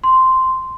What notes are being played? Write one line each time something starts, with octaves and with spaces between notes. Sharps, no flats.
C6